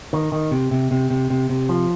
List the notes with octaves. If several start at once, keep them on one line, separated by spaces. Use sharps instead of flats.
D#3
D#3
C3
C3
C3
C3
C3
C3
F3